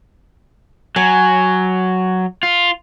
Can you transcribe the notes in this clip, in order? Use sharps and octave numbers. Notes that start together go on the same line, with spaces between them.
F#3 G#5
F4